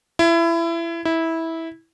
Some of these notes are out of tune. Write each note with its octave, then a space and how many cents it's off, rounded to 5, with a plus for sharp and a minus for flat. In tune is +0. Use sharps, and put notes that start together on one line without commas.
E4 +25
E4 -15